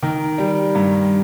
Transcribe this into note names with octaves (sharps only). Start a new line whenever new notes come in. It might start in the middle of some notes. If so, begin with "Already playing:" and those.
D#3
G3
G2